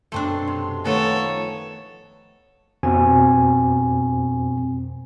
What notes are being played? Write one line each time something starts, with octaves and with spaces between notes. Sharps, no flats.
F#2 B2 A3 C4 D4 C6
C3
D#3 F3 A3 B3 A4 C#5
F2 B2 C4 G#5